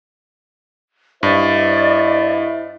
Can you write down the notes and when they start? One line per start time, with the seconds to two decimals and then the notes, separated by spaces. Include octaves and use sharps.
1.23 G2 E4 C5 D5 D#5